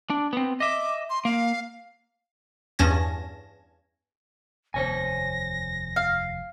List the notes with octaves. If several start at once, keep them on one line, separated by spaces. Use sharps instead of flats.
D4
B3 C4
D#5 E5 D6
C6
A#3 F5
E2 G2 C#4 A5 G#6 A#6
F1 D#2 C5 C#5 G#5 A#6
F5